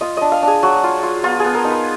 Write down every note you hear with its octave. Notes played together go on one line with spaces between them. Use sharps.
F4 D#5
D4 D#5
F5
D4 G#4
F#3 F#4
F4
F4
B3 F4
B3 G#4
A#4
D#4
B4